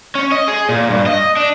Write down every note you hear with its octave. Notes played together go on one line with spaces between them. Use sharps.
C#4
D#5
G#4
A#2
G2
D#5
D4